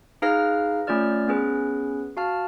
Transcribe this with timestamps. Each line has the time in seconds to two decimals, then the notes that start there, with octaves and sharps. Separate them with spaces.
0.22 D#4 G#4 B4 F5 F6 A#6
0.87 A3 C#4 F4 C#5 D5 F6
1.28 B3 C#4 G#4 B4
2.17 F#4 F5 A5 F6